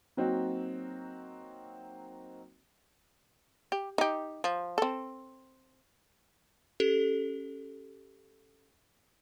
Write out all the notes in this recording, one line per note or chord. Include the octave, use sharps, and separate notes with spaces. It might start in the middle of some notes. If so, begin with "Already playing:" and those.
F#3 A#3 C4 D#4 F#4
G4
D#4 G4
F3
C4 A4
C#4 G4 A4